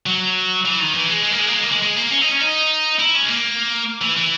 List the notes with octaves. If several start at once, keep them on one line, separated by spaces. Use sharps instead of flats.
F#3
E3
D#3
E3
G#3
G#3
A#3
G#3
A#3
G#3
A#3
G#3
G#3
A#3
C#4
D#4
C#4
D#4
E4
C#4
G#3
A#3
E3
E3